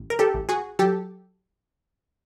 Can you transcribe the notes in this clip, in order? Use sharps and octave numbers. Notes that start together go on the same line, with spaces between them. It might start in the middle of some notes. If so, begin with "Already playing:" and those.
Already playing: A1
A#4
G4 A4
A1
F#4 G#4
F#3 G4 A4